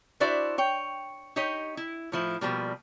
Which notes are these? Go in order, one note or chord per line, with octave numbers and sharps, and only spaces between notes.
D4 E4 F#4 C5 D5 E5
C#5 G5
D#4 G4 C#5 D#5
E4
A2 F3 E4
B2 F3 G3 A#3